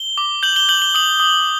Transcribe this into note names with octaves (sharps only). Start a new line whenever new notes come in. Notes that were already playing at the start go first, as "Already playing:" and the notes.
Already playing: G7
D6
G6 F#7
G7
G6 F#7
G7
D#6 F#7
D#6